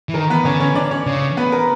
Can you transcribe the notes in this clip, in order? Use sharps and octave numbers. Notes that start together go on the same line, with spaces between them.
E3
D#3 A#4
B3 B4
D3 C#4 C#5
C#4 C#5
D4 D5
C#4 C#5
C#3
B3 B4
A#4